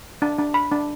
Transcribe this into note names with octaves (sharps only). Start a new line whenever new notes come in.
D4
D4
B5
D4